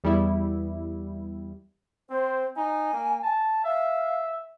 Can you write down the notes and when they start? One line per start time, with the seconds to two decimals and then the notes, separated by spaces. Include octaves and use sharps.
0.04 E2 G3 B3 E4
2.10 C4 C5
2.56 D#4 G#5
2.93 A#3
3.23 A5
3.64 E5 F5